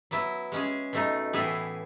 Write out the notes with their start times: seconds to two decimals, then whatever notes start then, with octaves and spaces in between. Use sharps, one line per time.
0.11 F#3 B3 E4
0.52 G#3 C#4 G#4
0.93 B2 A3 D#4
1.33 A2 E3 B3 E4 G#4